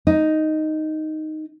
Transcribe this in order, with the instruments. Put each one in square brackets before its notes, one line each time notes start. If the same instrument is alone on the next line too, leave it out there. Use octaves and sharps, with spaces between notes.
[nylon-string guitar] D#4